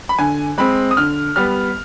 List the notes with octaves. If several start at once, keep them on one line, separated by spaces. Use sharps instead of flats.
B5
D3 G#5
G#3 C4 B5
D#6
D3 F6
G3 B3 F6